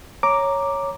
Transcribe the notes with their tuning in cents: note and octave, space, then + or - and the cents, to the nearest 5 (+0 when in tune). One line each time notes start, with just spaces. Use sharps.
C#5 +0 A#5 +0 D6 +0